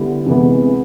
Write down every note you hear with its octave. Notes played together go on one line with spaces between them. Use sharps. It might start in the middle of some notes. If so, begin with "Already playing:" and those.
Already playing: D3 G3 B3 E4
C3 E3 G#3 B3